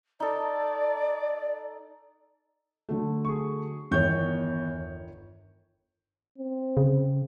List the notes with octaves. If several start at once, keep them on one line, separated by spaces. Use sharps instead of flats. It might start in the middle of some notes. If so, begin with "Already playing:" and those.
D#4 A4 D5
D3 F#3 A3
G#4 C#6
G1 E2 D#3 C#5 C#6 G6
C4
C#3